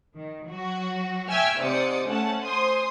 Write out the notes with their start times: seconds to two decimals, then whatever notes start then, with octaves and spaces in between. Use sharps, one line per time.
0.17 D#3
0.48 F#3 F#4
1.28 E5 G5 G#5 C#6 E6 F6
1.59 G#2 C3 C5 D5 D#6 C#7
2.07 A3 C#4 F#5 A5
2.42 C5 G#5 C6 D#6